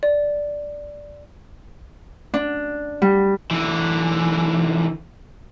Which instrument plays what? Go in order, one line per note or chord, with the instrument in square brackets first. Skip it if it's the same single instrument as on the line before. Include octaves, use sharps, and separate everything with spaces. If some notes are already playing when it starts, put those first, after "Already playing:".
[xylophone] D5
[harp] D4
G3
[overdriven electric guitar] D3 E3